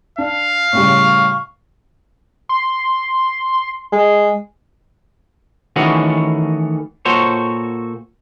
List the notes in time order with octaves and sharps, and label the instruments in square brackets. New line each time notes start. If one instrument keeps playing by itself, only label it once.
[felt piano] D4 [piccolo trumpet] F5
[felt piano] A2 C#3 G3 [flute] C#6
[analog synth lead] C6
[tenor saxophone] G#3
[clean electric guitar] D#3 E3 A3 C#4 F#4 G#4
A#2 F#4 A4 C5 C#5